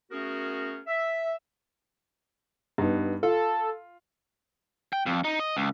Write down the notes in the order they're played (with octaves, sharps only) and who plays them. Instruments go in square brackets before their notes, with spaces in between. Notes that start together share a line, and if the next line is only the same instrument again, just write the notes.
[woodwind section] A3 B3 C#4 F#4 G#4 A#4
E5
[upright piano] G2 B3 D#4
[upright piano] F4 [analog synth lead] A4
[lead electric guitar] G5
F2
D#4
D#5
C#2